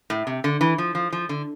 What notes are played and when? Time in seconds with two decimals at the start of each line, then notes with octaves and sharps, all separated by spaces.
0.10 A2
0.27 C3
0.44 D3
0.61 E3
0.78 F3
0.95 F3
1.12 F3
1.29 D3